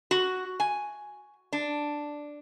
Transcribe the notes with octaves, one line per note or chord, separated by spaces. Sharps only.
F#4
G#5
D4